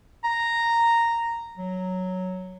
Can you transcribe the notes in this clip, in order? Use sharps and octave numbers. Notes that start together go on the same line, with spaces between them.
A#5
F#3